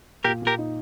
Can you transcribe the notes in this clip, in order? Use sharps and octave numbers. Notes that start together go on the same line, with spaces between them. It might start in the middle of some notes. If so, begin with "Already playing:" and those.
A#2 G4 A#4
A#2
G4 A#4
D#4